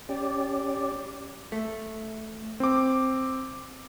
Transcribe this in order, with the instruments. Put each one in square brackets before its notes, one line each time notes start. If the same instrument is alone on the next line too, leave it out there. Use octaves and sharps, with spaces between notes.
[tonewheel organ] C#4 G4 D5
[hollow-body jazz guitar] A3
[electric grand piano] C4 D6